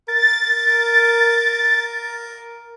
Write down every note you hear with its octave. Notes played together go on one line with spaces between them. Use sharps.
A#4 A6